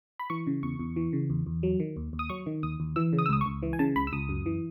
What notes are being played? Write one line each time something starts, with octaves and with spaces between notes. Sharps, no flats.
B5
E3 C#6
C#3
E2 C#6
E2
E3
C#3
E2
E2
F#3
D#3
D#2
D#2
D#6
F#3 C#6
D#3
D#2 D#6
D#2
E3 E6
C#3
D#6
E6
C#2 D#6
C#6
C#2
E3
G#5
C#3 A5
C#2 B5
E6
C#2 D#6
F#2
E3